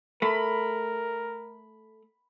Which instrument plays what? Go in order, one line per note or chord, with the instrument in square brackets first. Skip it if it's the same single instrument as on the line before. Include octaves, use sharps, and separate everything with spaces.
[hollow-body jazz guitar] A3 [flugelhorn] A#4 [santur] B5